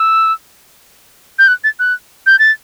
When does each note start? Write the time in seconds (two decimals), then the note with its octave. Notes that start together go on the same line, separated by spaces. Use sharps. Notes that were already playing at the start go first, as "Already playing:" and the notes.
Already playing: E6
1.39 G6
1.48 F#6
1.64 A6
1.79 F#6
2.26 G6
2.39 A6